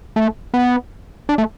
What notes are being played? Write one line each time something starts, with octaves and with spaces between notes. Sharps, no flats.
A3
B3
D4
A3